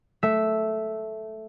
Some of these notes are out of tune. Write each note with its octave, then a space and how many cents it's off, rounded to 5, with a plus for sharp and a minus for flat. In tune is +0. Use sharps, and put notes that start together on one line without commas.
A3 -5 E5 +0